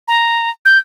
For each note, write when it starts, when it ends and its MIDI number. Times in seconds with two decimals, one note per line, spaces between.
0.08 0.50 82
0.65 0.78 91